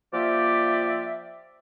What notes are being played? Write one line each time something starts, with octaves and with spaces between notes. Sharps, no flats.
F3 A#3 F4 G4 D5 E5